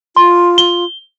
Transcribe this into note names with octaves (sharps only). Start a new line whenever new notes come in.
F4 C6
G7